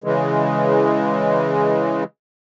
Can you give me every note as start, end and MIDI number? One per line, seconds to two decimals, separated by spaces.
0.04 2.04 49
0.04 2.04 52
0.04 2.04 56